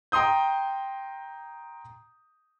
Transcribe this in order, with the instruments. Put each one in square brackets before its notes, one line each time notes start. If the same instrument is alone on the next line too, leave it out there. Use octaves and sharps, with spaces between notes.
[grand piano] G5 A#5 C6 D#6 G6